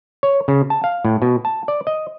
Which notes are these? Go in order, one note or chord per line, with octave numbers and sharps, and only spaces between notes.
C#5
C#3
A5
F5
A2
B2
A5
D5
D#5